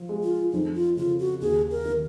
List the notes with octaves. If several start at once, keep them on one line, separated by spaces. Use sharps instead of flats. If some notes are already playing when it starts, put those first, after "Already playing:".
Already playing: F3
G#3
F4
F2 D#4
F4
C#3 F4
F#4
D#2 G#4
A#4
D#3